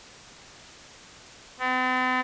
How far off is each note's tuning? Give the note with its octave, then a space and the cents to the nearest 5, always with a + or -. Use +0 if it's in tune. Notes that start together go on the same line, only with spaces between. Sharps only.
C4 -45